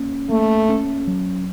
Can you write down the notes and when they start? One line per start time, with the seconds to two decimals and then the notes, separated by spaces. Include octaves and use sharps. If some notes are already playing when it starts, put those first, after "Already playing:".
Already playing: A#3 C#4
0.30 A3 A#3
0.69 C#4
1.07 F#3